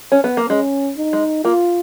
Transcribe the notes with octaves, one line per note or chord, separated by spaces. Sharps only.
C#4
B3
A#3
G#3 C#4
D#4
G#3
A#3 F4